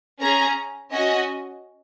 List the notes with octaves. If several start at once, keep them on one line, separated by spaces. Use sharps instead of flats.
C#4 G#4 A#5
C#4 F#4 D#5